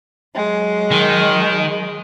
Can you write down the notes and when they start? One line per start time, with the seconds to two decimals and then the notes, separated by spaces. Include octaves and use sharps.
0.35 F#3 G#3
0.92 D#3